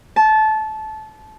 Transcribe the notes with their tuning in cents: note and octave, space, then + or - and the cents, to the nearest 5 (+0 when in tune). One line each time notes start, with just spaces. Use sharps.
A5 -20